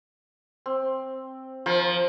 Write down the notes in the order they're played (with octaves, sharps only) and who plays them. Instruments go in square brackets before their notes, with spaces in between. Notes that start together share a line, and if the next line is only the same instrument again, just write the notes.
[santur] C4
[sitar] F3 [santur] A#4 C5